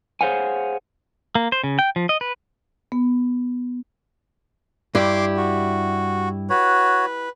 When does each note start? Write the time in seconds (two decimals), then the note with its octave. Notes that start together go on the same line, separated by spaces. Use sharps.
0.21 G#4 C5 C#5 F5 F#5 G#5
1.35 A#3
1.52 C5
1.64 C#3
1.79 G5
1.96 F3
2.09 D#5
2.21 B4
2.92 B3
4.95 G2 E4 G4 C6 D6
5.37 F#4
6.50 F#4 B4 C#5